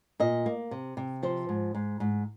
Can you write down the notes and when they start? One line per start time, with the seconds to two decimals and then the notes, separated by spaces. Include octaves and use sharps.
0.20 A#2 D#5
0.46 A#3
0.71 C3
0.97 C3
1.23 F3 C5
1.49 G#2
1.75 G#2
2.00 G#2